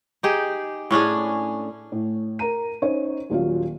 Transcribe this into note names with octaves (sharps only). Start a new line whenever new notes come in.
D#4 G4 G#4
A2 C#4 D4 G#4
A2
A#4 A#5 D#7
C#4 D#4 C5 C#5
D#1 A#2 F#3 F5